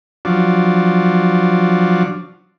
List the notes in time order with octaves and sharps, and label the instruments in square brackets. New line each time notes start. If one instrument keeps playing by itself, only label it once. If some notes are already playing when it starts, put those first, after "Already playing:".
[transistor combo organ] F3 F#3 D4